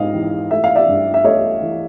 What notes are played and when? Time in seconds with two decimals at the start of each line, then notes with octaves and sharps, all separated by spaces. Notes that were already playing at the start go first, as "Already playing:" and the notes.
Already playing: G#2 D#5 F5
0.14 E3
0.51 A3 E5
0.64 F5
0.75 D5 E5
0.88 G2
1.14 E5
1.24 A3 C#5 D#5
1.62 E3